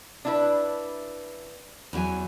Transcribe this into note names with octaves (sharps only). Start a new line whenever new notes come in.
D4 E4 B4
E2 F#3 G#5